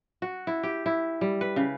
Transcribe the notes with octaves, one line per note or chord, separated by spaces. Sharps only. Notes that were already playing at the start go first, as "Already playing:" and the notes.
F#4
E4
G4
E4
G3
B4
C#3